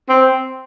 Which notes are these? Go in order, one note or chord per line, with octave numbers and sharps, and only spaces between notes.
C4